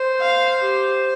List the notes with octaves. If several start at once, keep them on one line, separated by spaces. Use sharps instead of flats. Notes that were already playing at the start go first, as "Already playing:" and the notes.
Already playing: C5
F5
G4